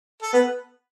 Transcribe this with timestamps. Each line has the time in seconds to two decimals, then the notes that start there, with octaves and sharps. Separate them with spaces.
0.22 A4
0.33 B3 B4